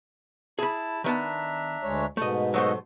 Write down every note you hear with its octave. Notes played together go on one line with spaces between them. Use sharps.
E4 G#4 A5 B5
D#3 B3 D4 E5 A5 A#5
D2 G#3 C#5
G#2 B2 A3 D#5
F#3 A3 F#4 A4 C5 D#5